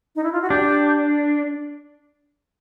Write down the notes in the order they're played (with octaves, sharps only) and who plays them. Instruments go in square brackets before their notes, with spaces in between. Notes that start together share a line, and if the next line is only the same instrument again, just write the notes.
[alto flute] D#4
E4
F4
F#4
[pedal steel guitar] D4 [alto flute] G4